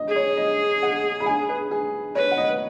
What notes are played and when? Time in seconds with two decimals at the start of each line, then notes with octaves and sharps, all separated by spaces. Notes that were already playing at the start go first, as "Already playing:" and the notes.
Already playing: D#5
0.08 G#4
0.16 C#5
0.37 D#5
0.83 F#5
1.20 B5
1.26 G#5
1.49 B4
1.71 G#4
2.15 B4 C#5
2.31 F#5
2.37 D#5